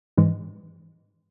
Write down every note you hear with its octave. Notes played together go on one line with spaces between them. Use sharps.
G#2 E3 G#3